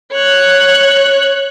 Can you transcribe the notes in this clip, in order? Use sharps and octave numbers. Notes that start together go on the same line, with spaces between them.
C#5 F#6